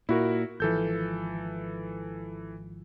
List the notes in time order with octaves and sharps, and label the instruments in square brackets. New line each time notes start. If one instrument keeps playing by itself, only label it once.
[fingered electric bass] A#2 [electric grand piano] E4 F#4 A#4
[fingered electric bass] G#1 F3 [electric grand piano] E3 A4 G6